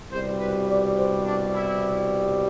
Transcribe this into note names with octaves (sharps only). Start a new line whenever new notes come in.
C2 B2 G3 C5
B4
D5
C5
D4
E4